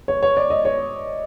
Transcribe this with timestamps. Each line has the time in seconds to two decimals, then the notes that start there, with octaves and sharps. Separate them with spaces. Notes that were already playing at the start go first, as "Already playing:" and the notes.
0.08 C#5
0.23 C#5
0.37 D5
0.50 D#5
0.65 C#5